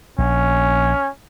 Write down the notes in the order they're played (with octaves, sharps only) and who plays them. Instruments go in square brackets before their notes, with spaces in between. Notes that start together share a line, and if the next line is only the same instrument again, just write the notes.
[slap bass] A#1 [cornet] C#4